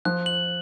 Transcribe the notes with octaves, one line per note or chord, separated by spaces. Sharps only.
F3 F#6
F#7